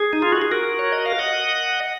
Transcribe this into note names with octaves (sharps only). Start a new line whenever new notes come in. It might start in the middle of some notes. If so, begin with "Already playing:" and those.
Already playing: G#4
D#4
F4
F#4
G#4
F#4 A#4
C#5
D#5
F5
D#5 F#5